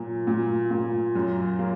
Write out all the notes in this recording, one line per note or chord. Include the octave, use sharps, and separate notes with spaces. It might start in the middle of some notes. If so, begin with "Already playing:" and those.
Already playing: A#2 F#3
A#2
A#2
F#2
A#3